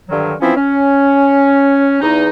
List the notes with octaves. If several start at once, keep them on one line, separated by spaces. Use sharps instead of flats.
G2 D3 D#3 F#3
E3 F3 C4 C#4 E4
C#4
E2 D#4